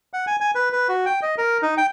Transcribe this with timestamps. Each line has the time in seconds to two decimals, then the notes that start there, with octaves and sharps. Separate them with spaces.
0.13 F#5
0.27 G#5
0.40 G#5
0.55 B4
0.72 B4
0.89 F#4
1.06 G5
1.22 D#5
1.38 A#4
1.62 D#4
1.77 G5